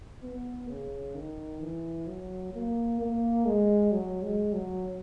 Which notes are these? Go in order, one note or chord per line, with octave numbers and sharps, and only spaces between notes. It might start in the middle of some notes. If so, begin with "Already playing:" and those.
B3
C#3
D#3
E3
F#3
A#3
A#3
G#3
F#3
G#3
F#3